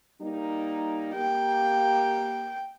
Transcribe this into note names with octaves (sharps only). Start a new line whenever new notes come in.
G3 A#3 D#4
A#3 G4 G5